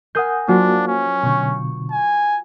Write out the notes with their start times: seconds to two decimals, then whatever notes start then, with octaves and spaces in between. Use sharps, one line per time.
0.15 A#4 F#5 G#5 D#6 G6 C7
0.48 F#3 A#3 D4 F4 F#4 C5
0.87 C#4
1.23 B2 D3 C#6 G6
1.91 G#5